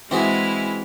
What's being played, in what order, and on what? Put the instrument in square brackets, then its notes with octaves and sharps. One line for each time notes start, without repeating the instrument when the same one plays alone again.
[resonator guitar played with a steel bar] E3 [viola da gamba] G#3 [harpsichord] C4 F#4 G#4 [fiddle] E4 F6